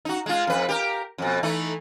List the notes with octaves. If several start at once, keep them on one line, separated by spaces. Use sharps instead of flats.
D#4 F#4
G#3 F4
F2 B4
G4 A#4
F2 B2
E3 A3 D#4